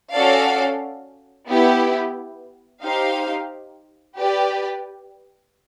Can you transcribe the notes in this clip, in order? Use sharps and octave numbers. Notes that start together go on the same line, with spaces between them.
C#4 F#4 A4 D5 F5
B3 E4 G4
D#4 G4 C5 F5
G4 B4 D5